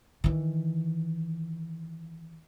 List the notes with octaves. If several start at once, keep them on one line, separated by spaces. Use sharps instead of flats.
D#3 E3